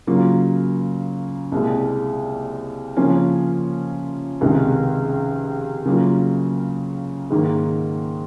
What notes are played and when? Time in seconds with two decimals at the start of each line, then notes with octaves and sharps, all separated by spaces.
0.07 C#3 F#3 A#3 F4
1.52 C2 A#2 G#3
2.97 C#3 F3 A#3 C#4 F4
4.41 C#2 C3 D#3 G#3
5.85 C#3 F#3 A#3 F4
7.30 G#2 D#3 A#3